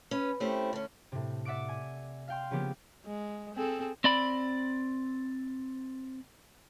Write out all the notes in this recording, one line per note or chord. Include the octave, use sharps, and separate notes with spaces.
C#4 B4
A3 C4 C#4 E4 G4 C5
D3 C#4
A2 C3
D5 E5 F#5 D6 D7
G#5
F5 G5 C6
C#3 F3 A#3 B3 G4
G#3
C4 G#4 A4
C4 D5 B5